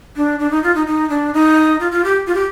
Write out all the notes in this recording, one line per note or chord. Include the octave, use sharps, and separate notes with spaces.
D4
D4
D#4
F4
D#4
D#4
D4
D#4
F4
F4
G4
F4
G4